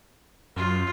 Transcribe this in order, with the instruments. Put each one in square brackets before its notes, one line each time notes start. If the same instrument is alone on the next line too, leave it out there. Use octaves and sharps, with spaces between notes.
[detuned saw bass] F#2 [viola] F4